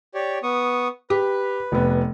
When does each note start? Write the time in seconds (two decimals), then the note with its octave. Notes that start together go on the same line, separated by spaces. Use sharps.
0.14 G4 C#5 D5
0.43 B3 C#6 D#6
1.10 G4 B4
1.72 F1 B3